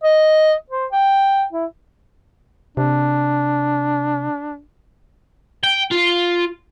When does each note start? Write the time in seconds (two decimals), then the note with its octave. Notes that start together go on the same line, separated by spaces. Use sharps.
0.04 D#5
0.70 C5
0.92 G5
1.53 E4
2.77 C3 D4
5.63 G5
5.92 F4